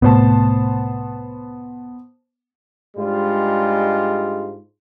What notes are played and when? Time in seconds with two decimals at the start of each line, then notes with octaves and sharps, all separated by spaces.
0.02 C2 A2 B3 C5 A5
2.97 G#2 G3 G#3 D4 F4